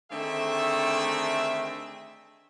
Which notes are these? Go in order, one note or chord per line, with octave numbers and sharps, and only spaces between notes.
D3 D#3 A3 C4 G#4 E5